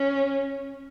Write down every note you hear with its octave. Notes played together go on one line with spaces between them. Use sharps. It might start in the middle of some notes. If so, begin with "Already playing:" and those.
Already playing: C#4